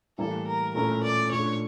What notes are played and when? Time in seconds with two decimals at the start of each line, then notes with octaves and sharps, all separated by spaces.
0.18 A2 E3 G3 A#3 A4
0.47 A#4
0.75 A#2 A3 C#4 E4 A#4
1.03 D5
1.31 A#2 A3 D4 C#5